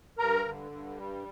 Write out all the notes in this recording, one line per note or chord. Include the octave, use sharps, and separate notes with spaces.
G2 A#4 A#5
D3
G2
G3